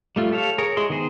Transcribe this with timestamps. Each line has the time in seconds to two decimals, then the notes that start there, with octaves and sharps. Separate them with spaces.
0.16 G3 A3 F4
0.32 G4 A4 C#5 F5
0.58 G#4 A#4 C#5
0.77 G#3 E4 G#4 C6
0.90 D#3 B3 G#4 C5